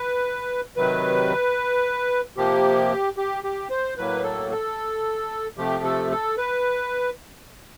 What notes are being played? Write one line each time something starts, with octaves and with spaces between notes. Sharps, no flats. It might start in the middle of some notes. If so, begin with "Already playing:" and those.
Already playing: B4
C3 D#3 F#3 B4
C3 F3 A#3 G4
G4
G4
C5
A2 F#3 A#3 B4
A4
A4
C3 F3 A3 G4
A4
A4
B4